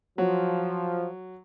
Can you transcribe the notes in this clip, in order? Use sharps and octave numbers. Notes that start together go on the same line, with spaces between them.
F3 F#3